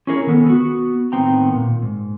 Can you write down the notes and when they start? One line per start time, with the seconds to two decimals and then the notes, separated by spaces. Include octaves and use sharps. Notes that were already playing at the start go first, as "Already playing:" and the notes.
0.07 C#4 E4 G#4 A#4 C5 C#5
0.27 D#3 B3 A4
0.46 B3 F#4
1.12 A2 D#3 B3 C4 G5 A#5
1.55 A#2
1.82 G#2